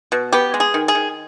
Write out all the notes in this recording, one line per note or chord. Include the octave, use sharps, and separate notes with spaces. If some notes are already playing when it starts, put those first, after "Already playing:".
B2
B3 G4
G#3
G#4
D#3
G#4
D#3